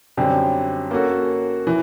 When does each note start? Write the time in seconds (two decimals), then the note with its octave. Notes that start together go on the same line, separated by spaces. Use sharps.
0.17 F#2 D3 G3 C4
0.91 A#3 C#4 F#4 A4
1.67 E3